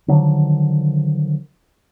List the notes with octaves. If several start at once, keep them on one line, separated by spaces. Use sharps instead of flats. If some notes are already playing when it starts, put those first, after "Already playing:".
D3 D#3 F3 F#3